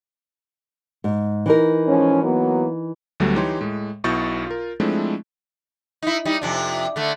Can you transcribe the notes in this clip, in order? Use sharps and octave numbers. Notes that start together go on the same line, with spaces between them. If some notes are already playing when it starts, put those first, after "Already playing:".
G#2
E3 D#4 A#4
G#2 F3 C#4
F#3 A#3 B3
D2 D3 F#3 G3 A3 B3
E3 D#4 G4 C#5 C6
A2 G#3
B1 B2 E4 C#6 G6 A6
F4 A#4
F3 G#3 A3 C4 D4 E4
D#4 E4
G3 D#4
F2 C3 D4
D3 A3